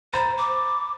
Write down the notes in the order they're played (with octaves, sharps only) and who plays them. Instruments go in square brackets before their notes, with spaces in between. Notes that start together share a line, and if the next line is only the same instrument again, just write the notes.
[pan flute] C5 [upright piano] A#5 B5 A6
[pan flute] D6